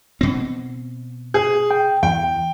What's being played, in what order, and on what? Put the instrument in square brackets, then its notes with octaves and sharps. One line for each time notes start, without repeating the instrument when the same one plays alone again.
[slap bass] B2 C4
[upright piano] G#4
[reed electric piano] G5
[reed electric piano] E2 [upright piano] G5